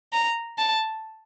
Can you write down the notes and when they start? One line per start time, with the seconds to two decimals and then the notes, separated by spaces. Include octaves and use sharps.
0.13 A#5
0.58 A5